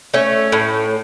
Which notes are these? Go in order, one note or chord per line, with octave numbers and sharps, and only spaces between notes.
A3 C#4
A2